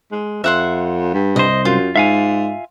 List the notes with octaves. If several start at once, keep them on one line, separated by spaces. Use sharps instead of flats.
G#3
F2 E5 F#5 C6
G2
C2 C5 D#5
F#2 F4
G#2 E5 F5 G#5